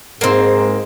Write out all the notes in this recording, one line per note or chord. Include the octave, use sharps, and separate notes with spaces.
G#2 A#3 C4